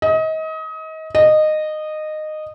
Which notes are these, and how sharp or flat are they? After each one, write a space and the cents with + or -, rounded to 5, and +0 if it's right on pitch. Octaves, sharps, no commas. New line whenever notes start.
D#5 +30
D#5 -15